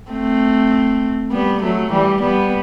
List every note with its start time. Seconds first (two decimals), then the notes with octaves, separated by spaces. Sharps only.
0.11 A3 C4
1.32 G3 B3
1.62 F#3 A3
1.92 E3 G3
2.21 G3 B3